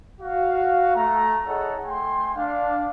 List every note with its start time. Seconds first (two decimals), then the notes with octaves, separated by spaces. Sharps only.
0.21 F#4 F5
0.96 A3 A#5
1.46 E4 G#4 A4 C#5 D#5 F#5
1.85 A3 G5 G#5 C6
2.35 D4 F5